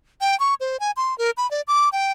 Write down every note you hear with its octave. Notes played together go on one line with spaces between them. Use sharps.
G5
C#6
C5
G#5
C6
A#4
B5
D5
D6
G5